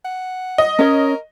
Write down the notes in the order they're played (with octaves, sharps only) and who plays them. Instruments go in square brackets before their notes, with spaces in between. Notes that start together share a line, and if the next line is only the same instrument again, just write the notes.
[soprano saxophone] F#5
[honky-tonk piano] D#5
[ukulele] C#4 C#5 [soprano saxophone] A#4